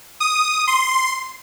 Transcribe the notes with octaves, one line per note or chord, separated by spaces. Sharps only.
D#6
C6